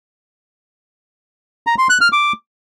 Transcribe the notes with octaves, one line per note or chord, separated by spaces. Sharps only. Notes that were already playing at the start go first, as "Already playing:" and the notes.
A#5
C6
F#6
F6
D6